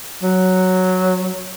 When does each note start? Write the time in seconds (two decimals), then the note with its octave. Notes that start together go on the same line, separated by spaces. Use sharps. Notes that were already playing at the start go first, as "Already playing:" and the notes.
0.23 F#3